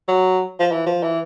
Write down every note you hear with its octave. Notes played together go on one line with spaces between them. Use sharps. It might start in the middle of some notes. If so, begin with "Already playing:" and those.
F#3
F3
E3
F3
E3